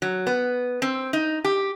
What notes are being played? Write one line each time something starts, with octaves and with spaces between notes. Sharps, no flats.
F#3
B3
C4
D#4
G4